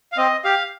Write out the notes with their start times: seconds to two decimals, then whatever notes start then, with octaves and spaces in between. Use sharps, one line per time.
0.12 F5
0.17 C4 D#5
0.44 G4 F5